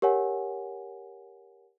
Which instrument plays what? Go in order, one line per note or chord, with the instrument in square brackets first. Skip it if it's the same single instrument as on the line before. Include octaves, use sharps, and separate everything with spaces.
[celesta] G4 A#4 C#5 F#5 G#5